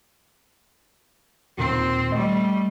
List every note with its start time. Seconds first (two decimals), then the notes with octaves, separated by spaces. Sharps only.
1.58 D#2 A#2 D#3 C4
2.12 G3 A3 D#5